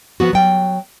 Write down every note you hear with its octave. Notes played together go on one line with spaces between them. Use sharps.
F3 B3 F#4
F#3 G5